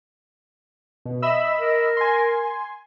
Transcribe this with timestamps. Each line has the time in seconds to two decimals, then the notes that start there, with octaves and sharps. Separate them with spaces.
1.05 B2
1.22 D#5 E5 B5 E6
1.59 A#4
1.97 G#5 C6